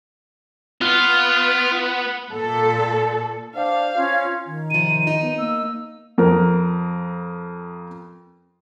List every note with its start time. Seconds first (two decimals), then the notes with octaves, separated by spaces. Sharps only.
0.81 B3 F4 F6
2.32 A#2 A4
3.55 D4 C5 F5
3.97 C#4 F4
4.46 D#3
4.70 C3 F3 D#7
5.07 D#4
5.21 B3
5.38 A#3 E6
6.18 F2 A#4